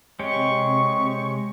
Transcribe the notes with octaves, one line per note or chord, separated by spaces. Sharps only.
C3 G#3 G4 C#5 C#6